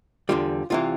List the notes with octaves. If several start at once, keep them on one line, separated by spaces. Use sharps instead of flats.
E2 D3 G3 F4
C2 C3 E3 F4